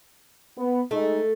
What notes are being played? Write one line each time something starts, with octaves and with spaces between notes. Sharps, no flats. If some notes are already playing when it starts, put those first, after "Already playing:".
B3
G#3 A3 D#4 D#5